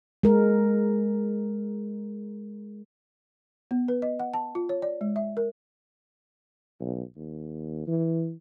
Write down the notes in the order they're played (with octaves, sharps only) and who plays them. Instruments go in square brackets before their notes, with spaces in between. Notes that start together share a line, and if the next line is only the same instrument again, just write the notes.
[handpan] G#3 A#4
[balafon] B3
B4
D#5
F#5
A5
F4
C#5
D5
G#3
E5
A#4
[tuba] B1
D#2
E3